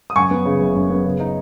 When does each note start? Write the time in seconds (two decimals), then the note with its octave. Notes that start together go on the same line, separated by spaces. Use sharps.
0.10 D#6
0.16 F#2 G#5 C#6
0.31 B3
0.45 C#3
0.60 F#1
0.75 F#2
0.90 B3
1.05 C#3
1.20 D#4